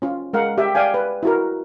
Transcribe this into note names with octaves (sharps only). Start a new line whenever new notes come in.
C#4 F4
G#3 A#4 F5 F#5
G4 E5 G5
D5 F5 G5 G#5
B4
E4 F#4 A#4